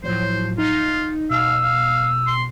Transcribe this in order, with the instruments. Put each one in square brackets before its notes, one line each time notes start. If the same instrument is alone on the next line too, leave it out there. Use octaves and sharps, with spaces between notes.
[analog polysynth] A2 F3 F#3 [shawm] C5
[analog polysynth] D#4 [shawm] F4
[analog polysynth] B2 [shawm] F5 [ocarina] E6
[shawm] F5
C6